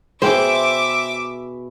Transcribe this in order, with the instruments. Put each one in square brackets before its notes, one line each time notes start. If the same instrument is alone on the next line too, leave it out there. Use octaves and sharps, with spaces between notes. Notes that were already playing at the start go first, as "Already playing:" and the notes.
[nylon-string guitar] B2 G#4 G5 [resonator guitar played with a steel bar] C5 [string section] E5 D6